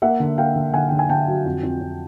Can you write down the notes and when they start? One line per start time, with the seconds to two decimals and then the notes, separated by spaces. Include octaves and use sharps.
0.02 A#3 E5 F#5
0.20 D3
0.38 A#3 F5 G5
0.56 D3
0.74 D3 F#5 G#5
0.89 D3 G5
0.99 G#5
1.09 D3 G5 A5
1.27 F#3
1.45 F2
1.63 F2
1.81 F2